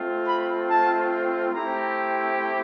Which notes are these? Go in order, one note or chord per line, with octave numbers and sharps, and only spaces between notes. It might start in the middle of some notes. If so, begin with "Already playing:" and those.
Already playing: A3 C4 F4
B5
A5
A3 C4 E4 G4 A#5